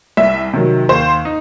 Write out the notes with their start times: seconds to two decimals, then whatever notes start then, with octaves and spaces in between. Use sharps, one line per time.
0.17 C2 E5
0.53 C3 D#3 F#3
0.89 D#2 C5
1.25 D#4